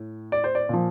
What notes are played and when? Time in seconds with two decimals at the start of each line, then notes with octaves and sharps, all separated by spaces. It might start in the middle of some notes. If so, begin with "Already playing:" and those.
Already playing: A2
0.32 D5
0.44 C5
0.55 D5
0.69 A#2 F3